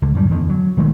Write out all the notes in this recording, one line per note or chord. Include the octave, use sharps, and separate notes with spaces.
C#2 D3
F#2 A2 G3
E2 D3 D#3
F#3
B1 D#3 G#3 A3